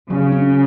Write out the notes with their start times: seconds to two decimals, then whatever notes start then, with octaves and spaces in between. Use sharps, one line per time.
0.10 C#3 F#3
0.32 C#4